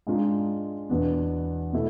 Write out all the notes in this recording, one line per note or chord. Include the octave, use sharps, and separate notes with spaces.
G#2 G#3 D4 F4
E2 B2 B3 D4
B2 A3 E4